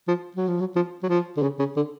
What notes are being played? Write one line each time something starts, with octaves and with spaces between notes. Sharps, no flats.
F3
F#3
F3
F#3
F3
F#3
F3
D3
C#3
C#3
D3